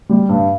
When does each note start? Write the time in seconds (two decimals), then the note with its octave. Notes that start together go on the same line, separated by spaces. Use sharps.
0.09 G3
0.29 G2